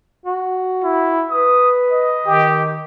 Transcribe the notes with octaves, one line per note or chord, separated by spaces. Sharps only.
F#4
E4
B4 D#6
D#5
D#3 G4